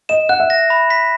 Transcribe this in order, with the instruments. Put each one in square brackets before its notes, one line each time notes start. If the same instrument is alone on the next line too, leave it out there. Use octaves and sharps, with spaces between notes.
[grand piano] D#5 [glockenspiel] E7
[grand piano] F#5 [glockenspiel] F#6
[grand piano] E5
[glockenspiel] A#6
B5
B6